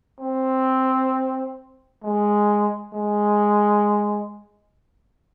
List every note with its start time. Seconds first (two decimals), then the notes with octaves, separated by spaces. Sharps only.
0.20 C4
2.03 G#3
2.93 G#3